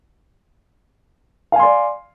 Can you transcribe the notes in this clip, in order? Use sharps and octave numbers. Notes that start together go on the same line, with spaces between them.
D5 F5 G#5 C6